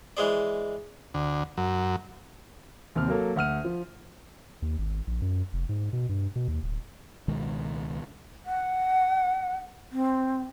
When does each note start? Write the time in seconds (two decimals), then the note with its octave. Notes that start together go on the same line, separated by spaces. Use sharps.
0.17 E3 G#3 G#4 C5 D5
1.14 D2
1.57 F#2
2.95 D#2 C3 F6
3.08 F#3 A#3 A4
3.36 D2 F#5 F6 D#7
3.65 F3
4.62 D#2
4.78 G#1
5.07 A#1
5.22 F#2
5.53 F1
5.69 G#2
5.93 B2
6.09 G2
6.36 B2
6.48 D#2
6.63 D1
7.28 C#2 B2 D#3 G#3
8.46 F#5
9.92 C4